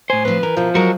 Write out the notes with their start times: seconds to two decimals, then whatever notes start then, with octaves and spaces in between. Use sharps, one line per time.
0.10 A2 C5 G#5
0.25 F3 C4 B4
0.43 E3 A#4
0.57 B2 F3 E4
0.75 F#3 G#3 F#4 A#4